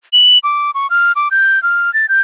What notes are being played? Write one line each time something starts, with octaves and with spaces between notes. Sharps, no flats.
F#7
D6
C#6
F6
D6
G6
F6
A6
G6